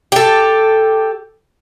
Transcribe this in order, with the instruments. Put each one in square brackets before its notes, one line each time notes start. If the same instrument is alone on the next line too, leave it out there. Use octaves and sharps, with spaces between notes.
[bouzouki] G4 A4